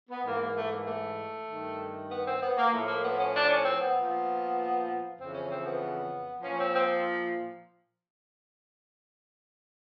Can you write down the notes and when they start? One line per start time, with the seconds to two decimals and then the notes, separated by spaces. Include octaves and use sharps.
0.09 B3
0.24 G#2 E3 A#3
0.40 A#3
0.56 A3
0.71 A#3
0.87 A3
1.49 G2 D#3
2.10 B3
2.25 C4
2.40 B3
2.56 A#3
2.71 A2 F3 A3
2.87 A#3
3.03 B3
3.18 C#4
3.34 D4
3.48 C#4
3.65 C4
3.80 B3
3.95 A#2 F3
5.19 F2 C#3 E3 C4
5.33 C#4
5.49 C4
5.65 B3
6.42 A#2 F3 C#4
6.58 C4
6.73 C4